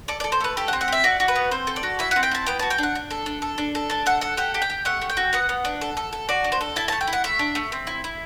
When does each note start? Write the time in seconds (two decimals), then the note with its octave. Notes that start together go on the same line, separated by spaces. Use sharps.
0.08 A4 D5
0.20 A4 D5
0.32 C5
0.41 A3 B4
0.57 G4 A4
0.68 F#5
0.73 C4
0.81 F#5
0.88 G4 E5
1.04 F#4 D5
1.20 F#4
1.28 B4
1.36 B3
1.51 C4 C5
1.67 A4
1.76 D5
1.83 F#4
1.99 E4 E5
2.11 C4 F#5
2.23 G5
2.31 E4 A5
2.47 B3 G5
2.59 F#4 A5
2.70 G5
2.78 D4 F#5
2.95 D4
3.11 A4
3.26 D4
3.42 A4
3.58 D4
3.75 A4
3.90 D4 A5
4.06 A4 F#5
4.21 A4 F#5
4.37 G4 F#5
4.54 G4
4.62 G5
4.70 G4
4.85 A3 F#5
5.02 A3
5.10 G5
5.17 F#4
5.33 B3 F#5
5.49 B3
5.65 D4
5.81 A4
5.97 A4
6.13 A4
6.29 F#4 D5
6.44 D4
6.52 C5
6.61 A4
6.76 E4 A5
6.88 A3 A5
7.01 G5
7.08 E4
7.13 F#5
7.24 A3 E5
7.39 D4
7.55 A3
7.72 C4
7.87 E4
8.04 E4